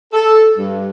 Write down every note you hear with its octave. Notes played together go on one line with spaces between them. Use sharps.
A4
G2